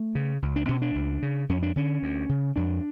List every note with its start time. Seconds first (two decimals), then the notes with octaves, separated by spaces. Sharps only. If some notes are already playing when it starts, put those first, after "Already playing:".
Already playing: A3
0.15 C#3
0.42 C#2
0.56 D4
0.68 B2 C#4
0.82 D4
0.95 C#2
1.22 C#3
1.49 F2 C#4
1.63 D4
1.76 D3 C#4
2.02 D2
2.29 C#3
2.56 F2 D4